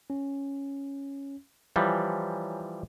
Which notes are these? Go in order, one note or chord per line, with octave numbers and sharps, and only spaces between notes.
C#4
E3 F3 G3 C#5 G#5 A#5